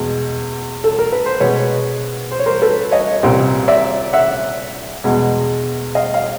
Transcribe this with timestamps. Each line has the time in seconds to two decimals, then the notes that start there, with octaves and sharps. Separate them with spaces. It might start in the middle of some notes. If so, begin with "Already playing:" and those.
Already playing: E2 B2 G#3
0.84 A4
0.99 A#4
1.12 B4
1.26 C5
1.40 B2 G#3 B3 B4 C#5
2.31 C5
2.39 C#5
2.46 A#4 C5
2.62 A4 B4
2.92 C#5 D#5
3.23 C2 A#2 G3 C4
3.68 D5 E5
4.13 E5 F#5
5.04 E2 B2 G#3
5.95 D#5 F5
6.14 F5